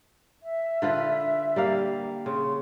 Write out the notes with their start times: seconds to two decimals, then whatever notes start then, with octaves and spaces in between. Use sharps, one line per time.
0.43 E5
0.82 D3 F4 B4
1.56 G3 A#3 F5
2.26 C#3 C6